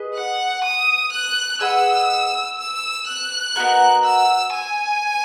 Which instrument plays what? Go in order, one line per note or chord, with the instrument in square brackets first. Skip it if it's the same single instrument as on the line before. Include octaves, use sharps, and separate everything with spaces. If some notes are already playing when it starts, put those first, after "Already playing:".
Already playing: [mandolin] G#4 B4 D#5
[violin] F#5
D#6
F#6
[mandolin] G#4 B4 D#5 F#5 [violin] E6
[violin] E6
F#6
[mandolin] B3 D#4 F#4 A#4
[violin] E6
G#5